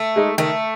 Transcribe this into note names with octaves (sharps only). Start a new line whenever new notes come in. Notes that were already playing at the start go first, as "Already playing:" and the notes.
Already playing: A3
G#3 D#4
D#3 A3